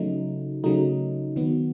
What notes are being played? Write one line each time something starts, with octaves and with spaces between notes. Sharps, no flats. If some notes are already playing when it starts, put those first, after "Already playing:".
Already playing: C#3 F#3 A3 D#4
C#3 F#3 A3 D#4
D#3 F#3 B3